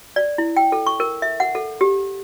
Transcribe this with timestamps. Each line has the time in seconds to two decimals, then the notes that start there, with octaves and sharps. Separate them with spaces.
0.16 D5
0.38 E4
0.57 G5
0.72 A4
0.86 C#6
1.00 A#4
1.22 E5
1.40 F#5
1.55 A4
1.81 G4